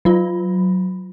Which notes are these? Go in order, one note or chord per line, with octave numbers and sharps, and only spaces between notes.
F#3 F4